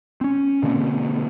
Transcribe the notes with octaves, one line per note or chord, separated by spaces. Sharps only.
C4 C#4
B2 D3 A#3 C4